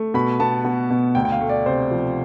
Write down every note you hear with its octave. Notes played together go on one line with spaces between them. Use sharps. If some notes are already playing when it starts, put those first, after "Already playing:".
Already playing: A3
B2 B5
B3 A5
B3
B2
D2 G5
G5
F5
A3
D5
C3 C5
F3